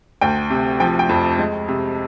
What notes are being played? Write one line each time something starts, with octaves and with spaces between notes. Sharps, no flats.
D2 G5
C3
F3 G5
G5
F2
G#3
C3